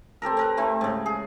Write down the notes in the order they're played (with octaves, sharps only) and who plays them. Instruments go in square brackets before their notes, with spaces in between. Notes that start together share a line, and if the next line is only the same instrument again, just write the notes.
[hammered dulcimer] C4 G4 A4 A#4
C4 A#4 B4
A3 C4 E4
G#2 C#3
G#4